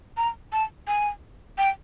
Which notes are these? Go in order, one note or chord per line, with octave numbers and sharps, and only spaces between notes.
A#5
A5
G#5
G5